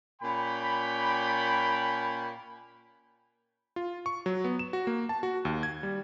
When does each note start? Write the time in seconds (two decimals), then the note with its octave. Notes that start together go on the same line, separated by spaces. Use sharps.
0.22 A#2 C#4 G5 B5
3.76 F4
4.06 C#6
4.26 F#3
4.44 B3
4.59 E7
4.73 F#4
4.87 A#3
5.09 A5
5.23 F#4
5.45 D#2
5.63 G#6
5.83 G3